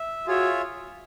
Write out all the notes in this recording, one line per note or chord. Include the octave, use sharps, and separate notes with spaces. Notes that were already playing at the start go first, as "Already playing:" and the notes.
Already playing: E5
F4 F#4 G#4 C#5 E5